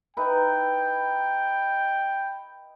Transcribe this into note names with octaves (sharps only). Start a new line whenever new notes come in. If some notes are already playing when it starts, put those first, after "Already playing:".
D#4 E4 B4 G5